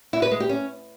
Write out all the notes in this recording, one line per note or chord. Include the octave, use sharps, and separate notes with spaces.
E4
B4
G#3
G4
C#4